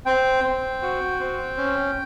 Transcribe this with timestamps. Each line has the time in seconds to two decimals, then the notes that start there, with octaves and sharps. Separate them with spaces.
0.06 C4 G5
0.44 C4
0.82 F#4
1.20 C4
1.58 C#4